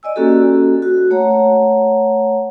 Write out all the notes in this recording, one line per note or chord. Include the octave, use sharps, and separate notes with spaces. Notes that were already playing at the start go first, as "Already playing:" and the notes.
D5 D#5 G#5 E6
A#3 C#4 F#4 G4 A4
F#4
A3 C#5 F#5 A#5